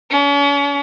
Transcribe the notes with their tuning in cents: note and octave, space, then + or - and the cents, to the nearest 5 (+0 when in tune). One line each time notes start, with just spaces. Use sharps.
C#4 +40